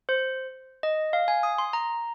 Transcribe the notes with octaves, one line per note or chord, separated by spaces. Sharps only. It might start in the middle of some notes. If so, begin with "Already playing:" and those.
C5
D#5
F5
G#5
D#6
C6
A#5